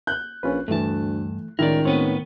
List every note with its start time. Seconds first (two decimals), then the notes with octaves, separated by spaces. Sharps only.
0.07 F#6 G6
0.43 A#1 C#4 F4 B4
0.68 D2 G2 E3 A3 A5
1.59 C#2 A2 D#3 E4 A#4 D5
1.85 A2 B3 C4 B4 C#5